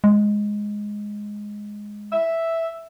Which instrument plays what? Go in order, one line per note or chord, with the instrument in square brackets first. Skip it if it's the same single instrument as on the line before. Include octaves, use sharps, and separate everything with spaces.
[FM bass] G#3
[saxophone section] E5